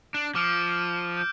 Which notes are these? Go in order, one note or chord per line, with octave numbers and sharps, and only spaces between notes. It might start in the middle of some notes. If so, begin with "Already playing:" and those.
D4
F3 D6 F6 D7
G6